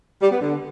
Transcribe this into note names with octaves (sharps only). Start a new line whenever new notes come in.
G3
B3
D3